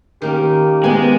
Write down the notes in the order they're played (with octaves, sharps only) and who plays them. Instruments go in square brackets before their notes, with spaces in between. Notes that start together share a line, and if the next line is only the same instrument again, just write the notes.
[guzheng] D#3 A#3 C#4 [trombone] G4
[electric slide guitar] G#3 [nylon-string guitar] B3 G#5